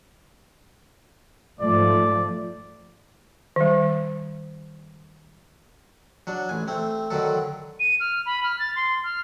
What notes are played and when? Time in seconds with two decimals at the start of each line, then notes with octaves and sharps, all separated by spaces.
1.61 G#2 F3 A3 D5
3.56 D#3 G3
6.27 F#3 D4
6.49 A1 G#5
6.68 A3 C4
7.10 D3 D#3 F#3 A4
7.80 D#7
8.00 F6
8.26 B5
8.43 F6
8.59 A6
8.76 C6
9.04 F6